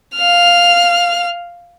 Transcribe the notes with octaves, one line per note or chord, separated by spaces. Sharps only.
F5 F6